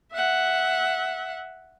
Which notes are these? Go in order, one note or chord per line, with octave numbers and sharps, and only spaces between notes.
E5 F#5